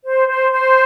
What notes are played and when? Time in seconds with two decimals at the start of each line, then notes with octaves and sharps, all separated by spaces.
0.04 C5
0.29 C5
0.53 C5